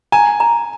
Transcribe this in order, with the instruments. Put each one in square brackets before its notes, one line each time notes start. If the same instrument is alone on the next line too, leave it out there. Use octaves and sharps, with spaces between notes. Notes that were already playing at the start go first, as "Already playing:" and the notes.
[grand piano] G#5 [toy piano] A#5
[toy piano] A#5